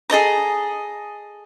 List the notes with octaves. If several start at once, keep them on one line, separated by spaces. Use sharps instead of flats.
G#4 A4 D#5 A#5